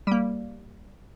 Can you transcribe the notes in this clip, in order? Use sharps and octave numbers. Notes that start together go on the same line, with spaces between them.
G3 A#3